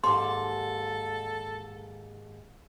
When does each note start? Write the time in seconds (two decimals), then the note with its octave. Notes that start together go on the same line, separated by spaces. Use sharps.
0.04 D#2 G#2 A4 A5 C6 D6